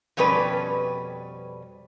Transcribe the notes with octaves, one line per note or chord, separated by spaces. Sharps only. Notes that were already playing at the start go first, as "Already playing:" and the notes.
F2 B2 G3 C#4 B4 D5